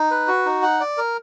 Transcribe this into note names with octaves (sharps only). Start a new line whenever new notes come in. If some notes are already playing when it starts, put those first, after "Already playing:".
Already playing: D#4
B4
F#4
D#4
F#5
D5
A#4